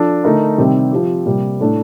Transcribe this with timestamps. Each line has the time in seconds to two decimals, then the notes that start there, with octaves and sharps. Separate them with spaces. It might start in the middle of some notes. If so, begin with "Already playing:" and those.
Already playing: F3 D4 A4
0.24 D3 A3 D#4 A#4
0.58 C3 D#3 G3 C4 G4
0.92 F3 C4 G4
1.25 C3 G3 A#3
1.60 A2 A3 D4